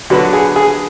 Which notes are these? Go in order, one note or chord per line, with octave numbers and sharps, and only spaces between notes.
D3 F#3 B3 D4 F#4
G#4
G#4